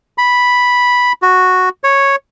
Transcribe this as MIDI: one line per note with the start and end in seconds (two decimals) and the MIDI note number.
0.18 1.12 83
1.22 1.69 66
1.84 2.16 73